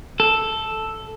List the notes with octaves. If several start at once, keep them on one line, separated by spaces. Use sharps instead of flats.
A4